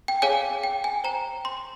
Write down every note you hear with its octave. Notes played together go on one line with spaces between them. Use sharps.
G5
G#4 C#5 F5 G#5
G5
G#5
C5 G5 A#5
C6